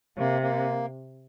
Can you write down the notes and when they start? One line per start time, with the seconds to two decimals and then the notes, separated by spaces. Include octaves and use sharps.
0.18 C3 A#3
0.42 A#3